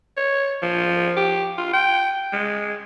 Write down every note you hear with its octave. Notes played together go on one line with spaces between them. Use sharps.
C#5
F3
G4
F4
G5
G#3